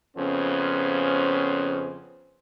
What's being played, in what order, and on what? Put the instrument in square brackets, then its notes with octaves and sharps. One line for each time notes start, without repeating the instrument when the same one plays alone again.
[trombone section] F2 C#3 B3 C#4 C5